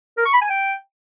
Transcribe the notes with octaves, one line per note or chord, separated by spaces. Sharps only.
A#4
C#6
B5
G#5
G5